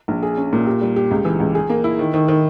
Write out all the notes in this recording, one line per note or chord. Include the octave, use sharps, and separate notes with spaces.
A#1
G#4
C#4
A#2
G4
G3
G4
C#2
E3
C#2
G#4
A#3
E4
D#3
D#3
D#3